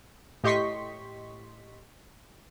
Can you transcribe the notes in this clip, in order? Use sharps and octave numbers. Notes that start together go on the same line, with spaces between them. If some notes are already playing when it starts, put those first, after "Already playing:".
A2 G4 D#5 C6 C#6 B6